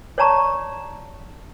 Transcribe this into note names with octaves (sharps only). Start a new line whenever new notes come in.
C#5 D5 A5 A#5 C#6